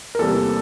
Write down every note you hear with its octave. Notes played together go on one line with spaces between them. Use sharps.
A#4
E2 C3 E3 G3 A#3 A4